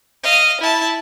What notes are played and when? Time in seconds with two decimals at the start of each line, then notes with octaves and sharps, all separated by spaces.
0.24 D#5 F5
0.61 E4 A5